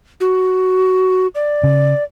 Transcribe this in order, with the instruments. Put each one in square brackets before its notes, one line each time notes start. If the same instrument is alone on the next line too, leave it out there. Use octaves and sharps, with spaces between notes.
[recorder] F#4
D5
[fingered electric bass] C#3